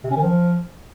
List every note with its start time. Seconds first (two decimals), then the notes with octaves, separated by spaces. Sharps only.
0.04 C3
0.10 C#4
0.16 D#3
0.22 F3